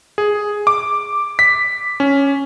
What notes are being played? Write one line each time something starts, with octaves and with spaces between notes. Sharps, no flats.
G#4
D6
B6
C#4